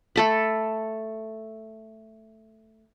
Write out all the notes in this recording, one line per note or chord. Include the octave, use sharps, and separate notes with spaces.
A3 A4 B5